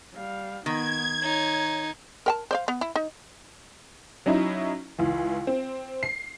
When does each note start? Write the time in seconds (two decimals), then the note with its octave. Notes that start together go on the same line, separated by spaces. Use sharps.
0.14 G3 F5
0.66 D#3 B3 D#4 G#6
1.23 D#4 C#5
2.26 A#4 G5 A5
2.51 C5 D5 F5
2.68 B3
2.81 E4
2.96 D#4
4.26 F#3 C#4 D#4 E4
4.98 C#2 E3
5.47 C4
6.03 C7